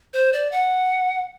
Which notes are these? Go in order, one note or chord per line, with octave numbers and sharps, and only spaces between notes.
C5
D5
F#5